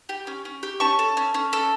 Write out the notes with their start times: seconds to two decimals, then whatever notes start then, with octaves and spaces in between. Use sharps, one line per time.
0.09 G4
0.27 C#4
0.45 C#4
0.63 G4
0.80 C#4 A5 C#6
0.99 A4
1.17 C#4
1.34 C#4
1.53 A4